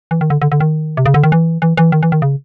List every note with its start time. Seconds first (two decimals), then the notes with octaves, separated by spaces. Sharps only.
0.11 E3
0.21 D#3
0.30 D3
0.42 D3
0.52 D3
0.60 D#3
0.97 C3
1.06 C#3
1.14 D3
1.24 D#3
1.32 E3
1.62 E3
1.77 E3
1.92 D#3
2.03 E3
2.12 D#3
2.22 C#3